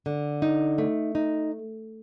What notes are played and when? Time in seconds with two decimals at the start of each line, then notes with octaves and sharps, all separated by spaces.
0.06 D3
0.42 D#4
0.78 A3
1.15 D#4